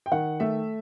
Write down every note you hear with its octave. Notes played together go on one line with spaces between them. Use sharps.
G5
D#3 F#5
A3 E5